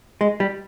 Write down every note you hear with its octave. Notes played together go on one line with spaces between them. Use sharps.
G#3
G3